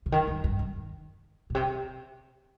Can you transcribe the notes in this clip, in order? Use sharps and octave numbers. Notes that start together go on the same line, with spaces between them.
C#3
D#3
F2
G2
D#3
A#2
C3